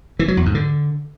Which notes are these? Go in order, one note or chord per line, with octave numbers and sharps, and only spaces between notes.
E3
F#3
E2
G#2
D3